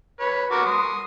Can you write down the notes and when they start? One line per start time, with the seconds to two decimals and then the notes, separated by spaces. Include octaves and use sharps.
0.20 B4 C#5
0.51 F#4 A#4 D6
0.66 C6 D#6